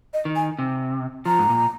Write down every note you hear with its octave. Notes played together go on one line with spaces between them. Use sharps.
D#5
D#3
G#5
C3
F3 A#5
G#2
A#2